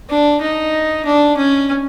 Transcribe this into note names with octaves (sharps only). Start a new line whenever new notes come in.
D4
D#4
D4
C#4